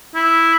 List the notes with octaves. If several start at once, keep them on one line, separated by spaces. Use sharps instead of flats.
E4